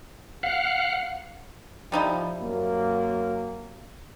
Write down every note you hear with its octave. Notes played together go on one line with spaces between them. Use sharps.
F5 F#5
F3 G3 D#4 E4
F#2 A#3